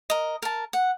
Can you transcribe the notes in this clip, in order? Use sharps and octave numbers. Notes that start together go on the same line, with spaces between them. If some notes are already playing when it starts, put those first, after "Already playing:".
A#4 D#5
A#4 A5
F#5